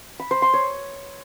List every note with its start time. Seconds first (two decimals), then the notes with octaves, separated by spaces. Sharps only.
0.19 B5
0.31 C5
0.42 C6
0.53 C#5